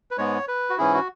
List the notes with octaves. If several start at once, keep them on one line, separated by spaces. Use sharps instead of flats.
B4
G#2 G#3 B3 C#5
B4
F#4
G#2 E3 C#4 E4 G#4
F#4